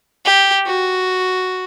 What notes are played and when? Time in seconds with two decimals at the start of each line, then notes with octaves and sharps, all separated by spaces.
0.25 G4
0.66 F#4